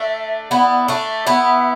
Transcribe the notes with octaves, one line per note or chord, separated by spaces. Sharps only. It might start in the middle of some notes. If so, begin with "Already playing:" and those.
Already playing: A3 D4 E5
B3 E4 D5
A3 D4 E5
B3 E4